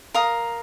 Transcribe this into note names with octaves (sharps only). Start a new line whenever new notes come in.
A#4 F5 A#5 D#6